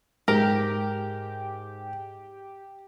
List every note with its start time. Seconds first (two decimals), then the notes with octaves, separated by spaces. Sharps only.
0.28 G#2 G4 A#4